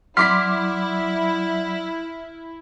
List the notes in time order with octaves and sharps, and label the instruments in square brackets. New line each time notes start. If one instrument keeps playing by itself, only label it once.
[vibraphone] F#3 D5 [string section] E4 [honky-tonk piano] C6 D6 B6 [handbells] F6